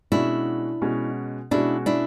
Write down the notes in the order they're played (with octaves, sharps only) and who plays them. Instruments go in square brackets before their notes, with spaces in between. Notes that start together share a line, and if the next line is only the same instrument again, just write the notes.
[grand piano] B2 G#3 C#4 F#4 [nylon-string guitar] D4 E4
[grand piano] B2 G#3 C#4 F#4
[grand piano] B2 G#3 C#4 F#4 [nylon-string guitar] D4 E4
[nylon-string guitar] D4 E4